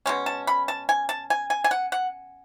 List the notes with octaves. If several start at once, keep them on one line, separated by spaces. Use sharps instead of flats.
B2 G#3 C#4
A5
B5
A5
G#5
A5
G#5
G#5
G#5
F#5
F#5